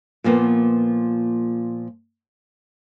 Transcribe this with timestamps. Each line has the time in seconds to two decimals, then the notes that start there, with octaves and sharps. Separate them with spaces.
0.24 A#2 F3 A#3 B3